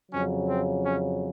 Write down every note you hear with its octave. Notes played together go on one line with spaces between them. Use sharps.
F2 C#3 F#3 C#4
C4
C#4